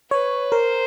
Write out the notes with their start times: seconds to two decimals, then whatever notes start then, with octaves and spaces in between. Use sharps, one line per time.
0.11 B4 C#5
0.52 A#4 C5